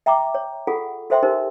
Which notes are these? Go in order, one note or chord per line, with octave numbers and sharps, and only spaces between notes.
E5 G5 A#5 C#6 D6
C#5
F4 G#4 A4 F#5
F#4 A4 C5 E5 G5 C6
D#4 G4 A#4 C5